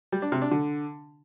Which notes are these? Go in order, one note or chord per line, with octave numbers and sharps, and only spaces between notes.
G3
D4
C3
D4
D3